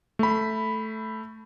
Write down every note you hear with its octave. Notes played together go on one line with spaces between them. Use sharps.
A3 B5